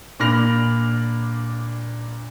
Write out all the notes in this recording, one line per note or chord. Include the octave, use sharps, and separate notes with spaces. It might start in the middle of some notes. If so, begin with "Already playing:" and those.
A#2 D4 B5 F6 A#6 F7